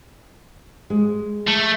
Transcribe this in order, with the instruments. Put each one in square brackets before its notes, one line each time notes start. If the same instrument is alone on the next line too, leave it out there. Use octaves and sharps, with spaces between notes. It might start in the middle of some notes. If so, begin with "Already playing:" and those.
[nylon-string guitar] G#3
[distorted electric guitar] A3